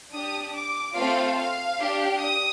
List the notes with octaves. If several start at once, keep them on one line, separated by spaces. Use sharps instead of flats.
D4 G4 D#6
D6
A3 C4 F4 A4 F5
F5
D4 G4
D#6